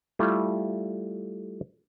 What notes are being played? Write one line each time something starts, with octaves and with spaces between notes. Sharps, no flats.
G3 A3 E4 F4